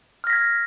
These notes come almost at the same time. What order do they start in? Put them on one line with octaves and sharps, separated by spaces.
F6 A#6 B6 G#6